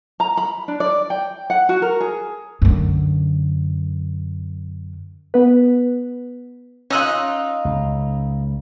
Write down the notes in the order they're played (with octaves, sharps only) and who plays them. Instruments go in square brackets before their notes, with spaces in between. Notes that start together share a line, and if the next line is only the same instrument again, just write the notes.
[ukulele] A#5
B5
D4
D5
G5
F#5
F#4
A#4
G#4
[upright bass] F#2 D3
[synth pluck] B3 B4
[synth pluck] C#4 F#6 [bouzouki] D#4 F4 [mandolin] D#5 E6
[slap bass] C#2